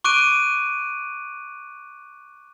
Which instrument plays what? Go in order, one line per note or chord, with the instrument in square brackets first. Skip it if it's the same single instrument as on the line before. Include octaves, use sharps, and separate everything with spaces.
[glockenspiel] C#6 D6 F#6 D7 D#7